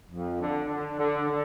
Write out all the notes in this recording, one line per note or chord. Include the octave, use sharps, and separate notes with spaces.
F2
D3
D3
D3
D3